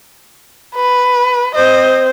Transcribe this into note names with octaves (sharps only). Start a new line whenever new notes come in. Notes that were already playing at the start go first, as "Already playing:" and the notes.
B4
C4 C5 D#5